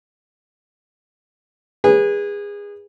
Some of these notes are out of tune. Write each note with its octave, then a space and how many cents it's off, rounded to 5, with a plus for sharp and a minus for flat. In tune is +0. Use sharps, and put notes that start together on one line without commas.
G#4 -25 B4 -20